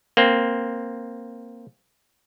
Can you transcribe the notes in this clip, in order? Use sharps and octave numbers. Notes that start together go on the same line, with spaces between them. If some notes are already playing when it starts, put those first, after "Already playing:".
A#3 C4